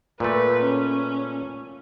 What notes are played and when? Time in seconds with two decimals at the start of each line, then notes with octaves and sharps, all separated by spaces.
0.20 A#2 A3 B4
0.63 C#4